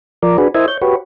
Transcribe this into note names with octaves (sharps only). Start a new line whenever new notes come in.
F3 A#4 D5
D4 F#4 G#4 B4
E4 A#4 C5 D#5 E5 G#5
C#5 G6
F#4 G4 B4 C#5